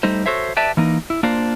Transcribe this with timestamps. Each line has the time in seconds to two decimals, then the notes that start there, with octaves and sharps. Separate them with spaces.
0.03 G3 A3 D#4 C5
0.26 F#4 A4 C5 C#5 E5
0.56 G4 B4 D5 E5 G5 A5
0.77 E3 A#3 D#4
1.10 E4
1.23 A#3 D4 F4 C5